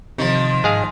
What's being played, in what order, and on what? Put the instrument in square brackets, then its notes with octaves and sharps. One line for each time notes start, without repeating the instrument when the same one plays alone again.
[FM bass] C3 [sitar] D#3 F3
[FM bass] G#2 [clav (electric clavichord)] G#3 G#4 F5